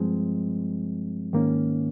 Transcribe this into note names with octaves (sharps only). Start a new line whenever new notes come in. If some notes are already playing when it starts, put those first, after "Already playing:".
Already playing: G2 F3 G#3 C4
G#2 D#3 A#3 C#4